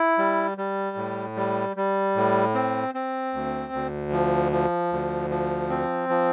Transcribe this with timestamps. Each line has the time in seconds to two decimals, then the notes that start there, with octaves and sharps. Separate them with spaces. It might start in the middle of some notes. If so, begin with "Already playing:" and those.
Already playing: E4
0.18 G3
0.58 G3
0.97 A2
1.36 G3
1.76 G3
2.16 A2
2.55 C4
2.95 C4
3.34 D2
3.73 D2
4.12 F3
4.52 F3
4.92 D2
5.30 F3
5.69 C4
6.09 F3